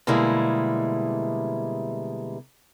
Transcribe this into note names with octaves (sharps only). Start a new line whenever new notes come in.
B2 D3 G3 G#3 A#3 E4